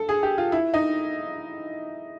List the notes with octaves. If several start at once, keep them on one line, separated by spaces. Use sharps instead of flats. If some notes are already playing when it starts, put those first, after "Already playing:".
Already playing: A4
G#4
G4
F4
E4
D#4